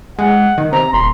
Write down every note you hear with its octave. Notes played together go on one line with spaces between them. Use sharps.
G#3 F#5
D#3
C3 A#5
D#1 C6